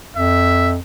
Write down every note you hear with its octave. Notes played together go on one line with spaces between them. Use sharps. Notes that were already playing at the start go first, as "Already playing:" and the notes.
F2 E5